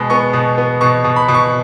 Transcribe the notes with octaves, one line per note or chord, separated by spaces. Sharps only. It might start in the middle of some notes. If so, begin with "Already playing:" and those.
Already playing: B2 G#3 B5
B3 C#6
B2
B3
B2 C#6
B2
B5
B2
C#6